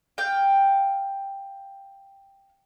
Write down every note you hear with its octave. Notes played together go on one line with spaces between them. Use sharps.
F5 G5